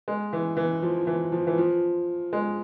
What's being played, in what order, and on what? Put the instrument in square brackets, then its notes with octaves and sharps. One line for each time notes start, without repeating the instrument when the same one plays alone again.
[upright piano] G#3
E3
E3
F3
E3
F3
E3
F3
G#3